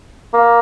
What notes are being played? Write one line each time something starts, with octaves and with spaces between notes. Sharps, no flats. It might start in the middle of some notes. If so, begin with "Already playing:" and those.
A#3